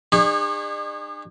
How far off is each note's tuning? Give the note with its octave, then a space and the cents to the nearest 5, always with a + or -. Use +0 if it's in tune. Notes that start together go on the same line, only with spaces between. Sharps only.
D4 +45 G#4 -40 C#5 -30